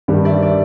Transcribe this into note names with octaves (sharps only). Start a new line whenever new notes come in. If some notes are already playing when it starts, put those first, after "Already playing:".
G2 D#3 G3
D5 E5
D5 E5